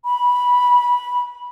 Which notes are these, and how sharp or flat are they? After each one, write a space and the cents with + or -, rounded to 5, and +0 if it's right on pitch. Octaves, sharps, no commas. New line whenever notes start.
B5 -10